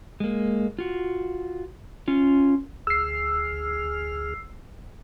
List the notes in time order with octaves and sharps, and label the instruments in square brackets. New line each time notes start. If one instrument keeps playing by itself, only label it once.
[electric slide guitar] G#3 A#3
F4 F#4
C#4 F4
[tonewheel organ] D2 G#4 F6 [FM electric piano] E6 C7